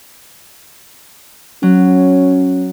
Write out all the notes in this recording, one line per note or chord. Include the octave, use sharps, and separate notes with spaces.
F#3 C#4